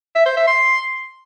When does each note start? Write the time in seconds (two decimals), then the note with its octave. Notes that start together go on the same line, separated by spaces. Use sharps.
0.15 E5
0.26 C5
0.37 E5
0.48 C6